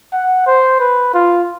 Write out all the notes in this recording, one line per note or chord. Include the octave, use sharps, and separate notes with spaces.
F#5
C5
B4
F4